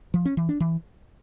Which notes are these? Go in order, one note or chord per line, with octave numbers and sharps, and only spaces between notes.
F3
C#4
E3
D4
E3